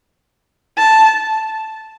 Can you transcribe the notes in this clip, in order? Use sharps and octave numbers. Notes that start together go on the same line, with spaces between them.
A5